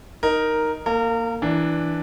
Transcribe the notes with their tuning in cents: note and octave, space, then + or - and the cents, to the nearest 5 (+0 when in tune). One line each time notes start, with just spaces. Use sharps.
D#4 +0 A#4 +0
A#3 +0 A#4 -35
E3 -5 D4 +0